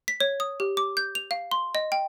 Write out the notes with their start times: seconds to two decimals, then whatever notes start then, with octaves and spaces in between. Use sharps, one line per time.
0.08 B6
0.20 C#5
0.40 D#6
0.60 G4
0.77 D6
0.97 G6
1.15 F7
1.31 F5
1.51 C6
1.75 D#5
1.92 G5